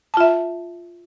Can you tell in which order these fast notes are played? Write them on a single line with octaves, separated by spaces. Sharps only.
A5 F4 E5